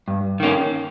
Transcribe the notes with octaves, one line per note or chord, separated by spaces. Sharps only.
G2
D#3 A#3 C#4